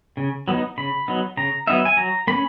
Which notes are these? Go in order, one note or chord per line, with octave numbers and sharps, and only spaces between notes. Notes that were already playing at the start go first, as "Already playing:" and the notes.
C#3
F#3 B3 D#4
C#3 B5
F#3 B3 D#4
C#3 A#5
F#3 B3 D#4 E5
G#5
F#3 A#5
A#3 C#4 B5